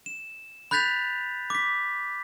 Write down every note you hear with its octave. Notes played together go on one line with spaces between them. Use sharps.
E7
B5 F#6 G6 A6 B6 F7
D6 B6